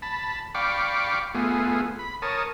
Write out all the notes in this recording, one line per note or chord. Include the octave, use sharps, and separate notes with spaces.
A5 B5
D5 F5 G5 B5 C#6 D6
A3 B3 F4 G#4
B5
A#4 C#5 A5 D#6